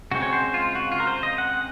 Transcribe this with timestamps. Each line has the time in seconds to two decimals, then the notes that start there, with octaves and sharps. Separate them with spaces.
0.11 C#3 G#3 C4 F#4
0.23 C#5
0.33 C5
0.54 F4
0.75 F#4
0.92 F4
1.00 A#4
1.07 C5
1.23 D#5
1.38 F#5